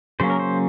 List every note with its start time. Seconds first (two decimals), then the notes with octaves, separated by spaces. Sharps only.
0.20 C#3 F#3 A#3 C#4 C5
0.30 A#4
0.39 C5